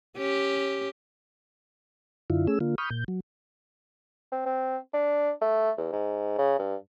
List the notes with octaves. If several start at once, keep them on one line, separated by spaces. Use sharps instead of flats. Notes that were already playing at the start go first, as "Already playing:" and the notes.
C#4 G4
F#2 D3 E4 F4
A3 C#4 G#4 E6
D3 A#3 F4
B5 C#6 D#6 F6 G6
A#2 G6
F#3
C4
C4
D4
A3
E2
G#2
C#3
G2